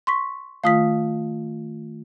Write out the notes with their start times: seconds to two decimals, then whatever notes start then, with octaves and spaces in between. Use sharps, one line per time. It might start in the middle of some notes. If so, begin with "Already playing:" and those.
0.07 C6 C#6 B6
0.64 D#3 A3 F4 F5 D#6 B6